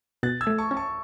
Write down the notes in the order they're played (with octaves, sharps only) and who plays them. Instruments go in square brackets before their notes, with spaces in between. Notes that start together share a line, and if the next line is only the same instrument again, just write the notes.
[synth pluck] B2 [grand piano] F#6 A6
[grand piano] E6 G#6
[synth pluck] A3
[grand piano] A5 C#6
[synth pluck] C#4
[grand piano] A5 C#6